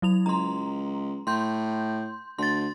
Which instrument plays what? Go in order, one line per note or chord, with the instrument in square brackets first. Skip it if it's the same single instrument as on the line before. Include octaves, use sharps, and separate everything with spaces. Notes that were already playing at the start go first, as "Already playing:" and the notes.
[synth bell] F#3 E4 F7
[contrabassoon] C#2 [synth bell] A#5 C6
[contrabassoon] A2 [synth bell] C6 G6
[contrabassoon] D2 [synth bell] C6 A6